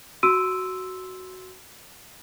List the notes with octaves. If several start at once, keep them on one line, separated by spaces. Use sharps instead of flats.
F#4 C6 E6 D7 D#7